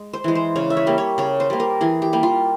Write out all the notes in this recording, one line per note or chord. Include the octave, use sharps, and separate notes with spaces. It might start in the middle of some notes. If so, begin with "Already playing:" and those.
Already playing: G#3
C5
E3 G#3
C5
C#3 C#5
E5
C#5
G3 A#3
C#5
C#3 C#5
C5
G3 A#3
A#4
E3 G#4
G4
G3 A#3
F4